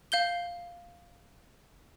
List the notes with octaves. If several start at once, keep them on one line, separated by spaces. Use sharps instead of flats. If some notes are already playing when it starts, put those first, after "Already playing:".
F5 G6 G7